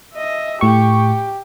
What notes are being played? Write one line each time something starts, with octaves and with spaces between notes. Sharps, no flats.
D#5 E5
A2 G4 C#6